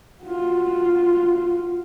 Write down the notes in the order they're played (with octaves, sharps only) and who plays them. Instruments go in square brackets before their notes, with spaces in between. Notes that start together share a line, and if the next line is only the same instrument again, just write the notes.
[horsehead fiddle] F4 F#4